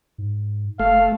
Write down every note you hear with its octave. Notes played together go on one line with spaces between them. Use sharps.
G#2
F1 A3 F5